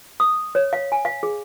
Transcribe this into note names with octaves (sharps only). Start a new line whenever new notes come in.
D#6
C#5
F5
G#5
F5
G#4